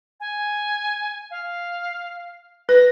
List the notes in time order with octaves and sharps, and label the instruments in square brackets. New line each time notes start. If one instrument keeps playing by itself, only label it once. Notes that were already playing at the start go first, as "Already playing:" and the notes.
[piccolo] G#5
F5
[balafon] B4 [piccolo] A#6